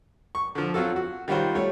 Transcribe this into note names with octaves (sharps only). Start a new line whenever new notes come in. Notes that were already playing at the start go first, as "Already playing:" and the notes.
C#6
D3 F3
F#3 C4 F4 F#4 A4
F#4
D#3 G3 F4 F#4 C5
G3 A3 C#5